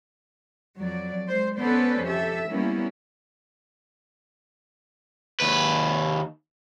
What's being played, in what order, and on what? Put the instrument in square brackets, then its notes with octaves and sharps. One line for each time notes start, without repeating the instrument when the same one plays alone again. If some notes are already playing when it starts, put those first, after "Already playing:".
[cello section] F2 F#3 D5
G#3 C5
B3 C#4 A4 B4 C5 D5
F2 G4 A4 E5
G3 A#3 B3 C#4 E4
[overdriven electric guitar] D#2 B4